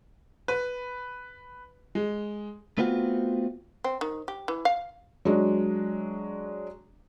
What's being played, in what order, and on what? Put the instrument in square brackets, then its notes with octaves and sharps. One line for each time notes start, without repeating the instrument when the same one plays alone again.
[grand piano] B4
G#3
[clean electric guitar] A3 B3 C4 F4 F#4
[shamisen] C4
D#3
G4
E3
F5
[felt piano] F#3 G#3 D4